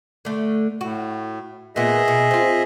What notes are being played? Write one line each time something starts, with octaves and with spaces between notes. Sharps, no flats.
D3 A3
A2 F#4
A#2 D#3 B3 G#4 D#5 E5
B2
C4 F4